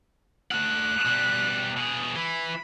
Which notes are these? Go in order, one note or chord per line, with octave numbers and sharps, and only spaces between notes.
A3 F#5 F#6
B2 G3
B2 G#4
E3 B5